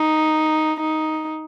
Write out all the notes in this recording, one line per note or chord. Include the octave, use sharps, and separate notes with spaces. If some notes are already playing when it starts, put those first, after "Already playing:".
Already playing: D#4
D#4